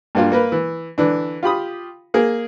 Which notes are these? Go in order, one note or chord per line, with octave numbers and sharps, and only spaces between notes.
G2 A#3 F4
A#3 A#4 B4
E3
D3 E3 D4
F4 G4 B5 D#6
A#3 G#4 A#4